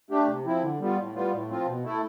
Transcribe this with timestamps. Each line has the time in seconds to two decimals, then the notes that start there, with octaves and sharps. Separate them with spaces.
0.10 A3 D4 G4
0.28 C3
0.45 F3 C4 E4
0.62 D3
0.80 G3 B3 F4
0.97 A2
1.15 G3 B3 F4
1.32 A2
1.50 F3 C4 F4
1.66 B2
1.84 A3 E4 A4